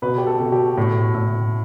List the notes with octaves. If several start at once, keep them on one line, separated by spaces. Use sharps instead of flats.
B2 B4
G4
A4
B2
F#4
G4
A2 A4
A2